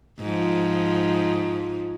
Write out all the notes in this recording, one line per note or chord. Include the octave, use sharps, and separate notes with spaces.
G#2 F3